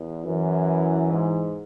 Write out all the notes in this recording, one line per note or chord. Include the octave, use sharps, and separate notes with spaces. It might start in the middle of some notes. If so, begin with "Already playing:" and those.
Already playing: E2
F#2 E3
G#2